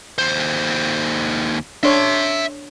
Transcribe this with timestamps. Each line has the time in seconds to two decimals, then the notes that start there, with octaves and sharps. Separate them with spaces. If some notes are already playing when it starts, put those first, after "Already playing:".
0.18 D#2 C5
1.83 D4 C#5 E5 C6